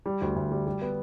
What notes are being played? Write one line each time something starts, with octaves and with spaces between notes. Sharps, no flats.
G3
D2
D2
G3
G3
B3